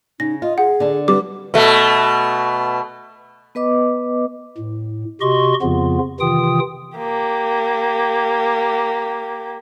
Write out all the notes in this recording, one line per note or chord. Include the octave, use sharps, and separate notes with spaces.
C#3 D#4 A#6
F4 D#5
G#4 F#5
D3 D4
G3 B4 D6
B2 A3
B3 B4 D#5 D6
A2
C3 F#4 G4 D#5 C6 C#6
F2 C#3 F3 B3 F4
C3 D#3 E3 F4 G5 D#6
A#3 G4